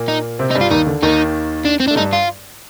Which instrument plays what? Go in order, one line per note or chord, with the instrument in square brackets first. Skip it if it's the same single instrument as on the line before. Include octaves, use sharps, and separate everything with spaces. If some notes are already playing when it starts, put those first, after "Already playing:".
Already playing: [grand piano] A#2 A#3
[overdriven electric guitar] D#4
[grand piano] C3 C4
[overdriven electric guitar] D#4
[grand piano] G2 G3
[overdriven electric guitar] F4
[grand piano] D#2 D#3 [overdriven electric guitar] D#4
[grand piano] D3
[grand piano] D#2 D#3 [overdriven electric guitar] D#4
[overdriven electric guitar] D4
C4
[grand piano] A3 [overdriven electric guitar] D4
[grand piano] G2 G3 [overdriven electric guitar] D#4
[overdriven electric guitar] F4